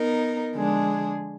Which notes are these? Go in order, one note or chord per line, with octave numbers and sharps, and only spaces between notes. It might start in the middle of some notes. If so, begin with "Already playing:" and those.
Already playing: B3 D#4 A#4
D3 F3 G#3 D4 G#4